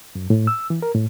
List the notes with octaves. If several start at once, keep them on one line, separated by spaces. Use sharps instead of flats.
F#2
A2
E6
E3
A#4
A2